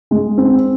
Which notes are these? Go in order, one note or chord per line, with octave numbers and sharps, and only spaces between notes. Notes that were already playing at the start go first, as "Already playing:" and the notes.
G#3
C4